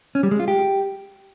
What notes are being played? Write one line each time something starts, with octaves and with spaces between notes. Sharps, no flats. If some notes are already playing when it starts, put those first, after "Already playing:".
C#4
G3
G#3
F4
G4